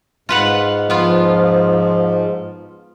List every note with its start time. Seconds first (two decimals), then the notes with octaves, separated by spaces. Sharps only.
0.29 G#2 F4 B4 F#5
0.90 F3 B3 F4